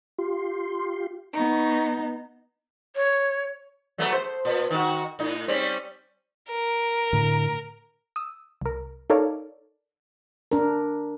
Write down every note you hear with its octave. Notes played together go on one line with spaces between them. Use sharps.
F4 G4 C6
B3 D#4 B5 C#6
C#5
F#3 A3 B3
C5
A#2
D#3 F#4
A2 D#4
G3 C4 C#4
A#4
A2 D3
D#6 E6
C2 A#4
D#4 A4 A#4 C#5 D5 F5
D4 A#4